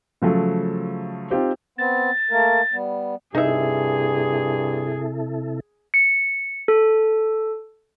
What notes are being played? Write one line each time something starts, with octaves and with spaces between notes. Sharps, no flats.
C#3 F3 F#3 A3
C4 D#4 F4 G4 C5
B3 C4 A6
A3 A#3 A#4
G3 B3
G2 C3 D#4 E4 G#4 A4 E5
C#7
A4